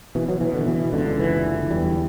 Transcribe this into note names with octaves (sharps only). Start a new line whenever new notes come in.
B2 E3
F#3
B2 E3
D3
B2 E3
C#2 D3
F#1 E3
D3
E2 G3